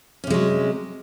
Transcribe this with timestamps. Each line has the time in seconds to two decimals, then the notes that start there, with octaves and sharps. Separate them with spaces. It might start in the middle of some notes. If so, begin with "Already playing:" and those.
0.24 C#4
0.27 C3
0.30 G#3
0.34 F#3